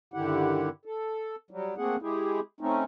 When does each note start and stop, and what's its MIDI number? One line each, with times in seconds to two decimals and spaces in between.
0.14 0.69 43
0.14 0.69 50
0.14 0.69 51
0.14 0.69 64
0.14 0.69 67
0.14 0.69 78
0.85 1.35 69
1.51 1.74 54
1.51 1.74 55
1.78 1.96 57
1.78 1.96 58
1.78 1.96 60
1.78 1.96 68
1.78 1.96 78
2.02 2.40 56
2.02 2.40 64
2.02 2.40 67
2.02 2.40 68
2.61 2.84 57
2.61 2.84 60
2.61 2.84 61
2.61 2.84 63